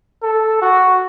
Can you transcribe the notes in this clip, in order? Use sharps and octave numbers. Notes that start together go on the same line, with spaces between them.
A4
F#4